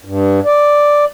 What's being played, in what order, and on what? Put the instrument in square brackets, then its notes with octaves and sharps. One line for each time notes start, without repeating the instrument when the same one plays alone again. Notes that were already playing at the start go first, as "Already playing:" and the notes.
[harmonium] G2
D5